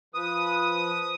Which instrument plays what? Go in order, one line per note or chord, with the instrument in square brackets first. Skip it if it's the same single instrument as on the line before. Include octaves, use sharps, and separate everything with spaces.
[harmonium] F3 B4 [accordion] D#6